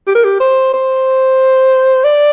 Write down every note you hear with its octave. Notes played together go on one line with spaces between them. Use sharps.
G4
A#4
G4
C5
C5
D5